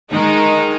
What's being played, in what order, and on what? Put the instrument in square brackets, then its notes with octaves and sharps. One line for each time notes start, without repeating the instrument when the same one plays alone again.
[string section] D#3 G#3 D#4